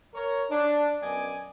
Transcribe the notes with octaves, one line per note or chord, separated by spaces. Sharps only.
A#4 C#5
D4
F#2 B3 D5 D#5 G#5